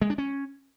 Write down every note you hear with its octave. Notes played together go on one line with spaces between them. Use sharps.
G#3
D4
C#4